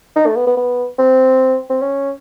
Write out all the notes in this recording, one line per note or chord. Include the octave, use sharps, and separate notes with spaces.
D#4
A3
B3
B3
B3
C4
C4
C#4